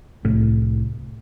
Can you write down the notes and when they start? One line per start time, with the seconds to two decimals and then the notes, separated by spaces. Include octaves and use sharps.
0.25 C2 A2 A3